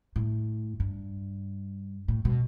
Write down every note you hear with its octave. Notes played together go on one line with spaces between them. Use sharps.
A2
G2
A2
B2